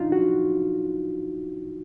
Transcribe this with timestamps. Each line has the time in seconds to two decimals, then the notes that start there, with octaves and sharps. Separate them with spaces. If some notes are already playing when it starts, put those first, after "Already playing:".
Already playing: D4 D#4 F4
0.12 F#4